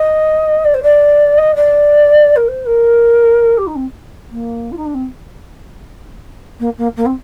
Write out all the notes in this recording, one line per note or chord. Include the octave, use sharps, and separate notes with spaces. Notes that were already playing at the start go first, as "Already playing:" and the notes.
Already playing: D#5
D5
C5
D5
D#5
D5
A#4
C5
A#4
G4
D#4
C4
A#3
F4
D#4
D4
C4
A#3
A#3
A#3
C4